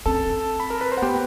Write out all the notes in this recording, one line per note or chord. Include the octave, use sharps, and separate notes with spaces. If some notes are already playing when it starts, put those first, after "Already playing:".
C4 A4 A5
B5
A#4 A#5
B4 B5
C5 C6
F#5
B3 G4 G5